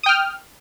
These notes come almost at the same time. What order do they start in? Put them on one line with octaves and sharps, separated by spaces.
D#6 G5 F6